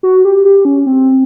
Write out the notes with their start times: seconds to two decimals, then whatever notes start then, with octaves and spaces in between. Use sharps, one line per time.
0.03 F#4
0.25 G4
0.45 G4
0.65 C#4
0.86 C4